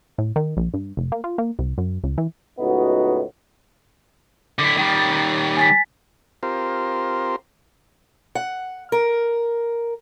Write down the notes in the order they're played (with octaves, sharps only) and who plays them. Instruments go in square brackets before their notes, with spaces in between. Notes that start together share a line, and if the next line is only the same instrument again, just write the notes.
[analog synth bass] A2
D#3
A#1
G2
F1
A#3
F4
A#3
C2
F#2
C#2
E3
[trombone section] C#2 A2 B3 D#4 F#4
[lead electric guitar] D3 E4
D#3 G3
[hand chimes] G#5 A6 B6
[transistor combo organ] C4 F4 G4 A#4 C5
[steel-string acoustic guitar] F#5
A#4